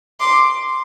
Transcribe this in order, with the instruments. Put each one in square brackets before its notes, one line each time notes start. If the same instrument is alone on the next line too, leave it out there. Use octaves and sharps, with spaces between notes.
[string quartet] C6 D6